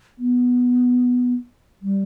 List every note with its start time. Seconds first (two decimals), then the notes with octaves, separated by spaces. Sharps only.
0.19 B3
1.82 G3